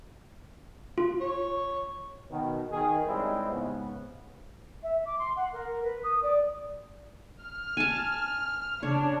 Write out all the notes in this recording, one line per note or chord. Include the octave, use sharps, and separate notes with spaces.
F4
C#5
B2 D#3
D#3 G#4
G3 G#3 C4 C#4 D#4 E4
G#2 C#3 B3
E5
D6
C6
F#5
A#4
B4
D#6
D5
F6
G#5 A5
C#3 D4 C#5